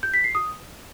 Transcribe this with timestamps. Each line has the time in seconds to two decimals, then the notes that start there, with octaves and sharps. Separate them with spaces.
0.03 G6
0.14 B6
0.24 C7
0.35 D#6